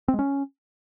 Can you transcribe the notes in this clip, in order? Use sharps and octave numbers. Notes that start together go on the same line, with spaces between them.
C4
G#3
C#4